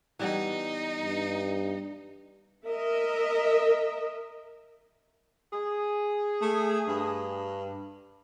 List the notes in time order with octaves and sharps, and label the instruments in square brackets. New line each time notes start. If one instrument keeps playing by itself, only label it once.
[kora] E3 G3 B3 [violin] D#4
[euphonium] G2
[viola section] A#4 D#5 E5
[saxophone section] G#4
[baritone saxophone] A3
G2